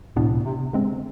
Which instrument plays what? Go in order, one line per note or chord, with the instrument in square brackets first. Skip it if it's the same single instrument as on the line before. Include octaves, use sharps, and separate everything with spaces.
[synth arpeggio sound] D2 C3 E3 B3 D4 [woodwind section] A2
[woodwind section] C3
[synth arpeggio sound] D3 G#3 C4